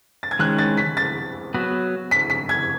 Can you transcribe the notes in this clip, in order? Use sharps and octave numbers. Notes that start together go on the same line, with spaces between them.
A6
G#6
D#3 G#3 C#4 F#6
A6
B6
A6
F#3 B3 F#4 B4
B6
B6
G#6